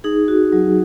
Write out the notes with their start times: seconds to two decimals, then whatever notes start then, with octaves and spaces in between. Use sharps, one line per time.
0.04 D#4 G#4
0.28 F#4
0.52 F#3